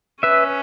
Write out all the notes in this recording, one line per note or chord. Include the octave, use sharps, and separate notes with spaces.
C#4 B4 E5